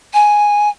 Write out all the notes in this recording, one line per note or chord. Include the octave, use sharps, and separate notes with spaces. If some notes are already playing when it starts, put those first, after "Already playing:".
G#5